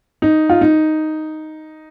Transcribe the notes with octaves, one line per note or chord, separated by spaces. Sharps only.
D#4
F4
D#4